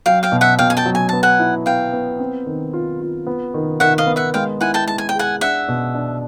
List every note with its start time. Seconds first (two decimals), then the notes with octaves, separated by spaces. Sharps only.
0.06 F#3 F5 G5
0.23 F5 G5
0.32 B2
0.41 E5 F#5
0.59 B2 F5 G5
0.70 G#5
0.77 G5 A5
0.86 F#3
0.95 G#5
1.09 B3 A5
1.23 F#5 G#5
1.40 E4
1.66 B3 F5 G5
1.93 B3
2.19 C4
2.46 D#3
2.73 F4
3.01 F4
3.27 B3
3.54 D#3
3.80 D#3 E5 F#5
3.98 D#5 F5
4.07 B3
4.16 E5 F#5
4.34 G#3 F5 G5
4.61 E4 F#5 G#5
4.74 G5 A5
4.88 G#3 A5
4.98 G#5
5.09 G5
5.15 G#4 F#5 G#5
5.41 D4 E5 F#5
5.68 B2
5.95 D4